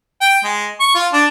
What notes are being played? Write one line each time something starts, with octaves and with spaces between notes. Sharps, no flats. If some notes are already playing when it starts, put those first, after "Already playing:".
G5
G#3
C#6
F4
D4